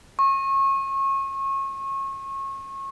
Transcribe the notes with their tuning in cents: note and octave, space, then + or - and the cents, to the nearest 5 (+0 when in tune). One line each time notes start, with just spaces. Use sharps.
C#6 -30